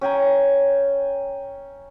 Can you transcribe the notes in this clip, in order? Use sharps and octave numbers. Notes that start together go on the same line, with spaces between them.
C#4 G5 G#5 A#5